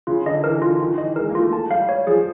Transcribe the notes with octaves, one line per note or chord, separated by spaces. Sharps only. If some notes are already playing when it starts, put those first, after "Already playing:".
C#3 F4
D3 D#5
E3 A#4
D3 F4
D#3 F4
E3 D#5
G#3 A#4
A#3
A3 F4
A5
G3 F5
C#5
F3 G#4